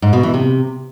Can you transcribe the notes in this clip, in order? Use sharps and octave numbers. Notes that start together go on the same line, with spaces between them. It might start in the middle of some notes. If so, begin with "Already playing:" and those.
G#2
B2
E3
C3